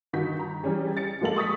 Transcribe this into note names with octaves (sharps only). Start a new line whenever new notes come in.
G2 D#3 F#4 G6 B6
A#5
E3 G3 C#4 G#4
A6 C#7
F3 G#3 A#3 A4 F#7
C#6 D#6 A6 B6